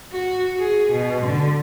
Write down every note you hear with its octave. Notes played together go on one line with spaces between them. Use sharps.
F#4
G#4
B2
D3